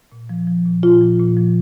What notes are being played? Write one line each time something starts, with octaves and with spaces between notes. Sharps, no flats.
A#2
F3
F3
A#2
A#2 F4
F3
A#2
F3